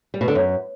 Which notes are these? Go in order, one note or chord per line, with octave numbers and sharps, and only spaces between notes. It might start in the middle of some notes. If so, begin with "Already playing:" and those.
G3
B2
D3
F#2